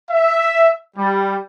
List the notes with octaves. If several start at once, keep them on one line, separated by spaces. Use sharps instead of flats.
E5
G3